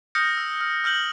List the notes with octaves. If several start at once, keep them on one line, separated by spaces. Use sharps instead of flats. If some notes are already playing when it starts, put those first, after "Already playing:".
D#6 F6 G6 A#6 C#7
E6
F6
E6 F6 G6 F#7